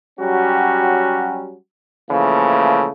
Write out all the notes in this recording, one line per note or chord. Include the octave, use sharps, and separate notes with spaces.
F#3 G3 C#4 F#4 G4
C#3 E3 F3 A3 A#3